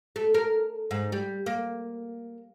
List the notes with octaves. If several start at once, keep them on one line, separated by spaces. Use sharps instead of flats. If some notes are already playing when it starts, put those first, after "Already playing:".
A3
A#4
G#2
G3
A#3